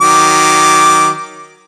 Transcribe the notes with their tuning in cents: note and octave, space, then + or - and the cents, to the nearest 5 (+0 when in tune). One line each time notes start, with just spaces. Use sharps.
D#3 +0 F#3 +0 D6 +0